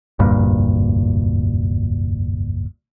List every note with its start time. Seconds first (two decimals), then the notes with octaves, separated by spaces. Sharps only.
0.19 F1 D2 G2 A#2